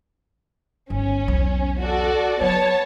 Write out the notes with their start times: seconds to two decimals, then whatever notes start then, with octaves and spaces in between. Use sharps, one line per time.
0.90 G1 D#3 C#4
1.28 B1 E2
1.80 F#4 A4 D5
2.41 F#3 B3 C#5 A5